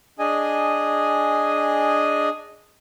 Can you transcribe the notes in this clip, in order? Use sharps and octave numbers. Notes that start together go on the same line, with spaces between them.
D4 G#4 D#5 G#5